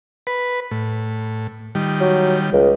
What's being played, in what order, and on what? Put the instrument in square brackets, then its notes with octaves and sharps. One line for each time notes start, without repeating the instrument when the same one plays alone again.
[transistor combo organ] B4
A2
D#3 G3
[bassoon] F#3
C#2